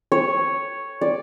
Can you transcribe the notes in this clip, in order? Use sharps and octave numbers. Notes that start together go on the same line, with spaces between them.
C#5
D5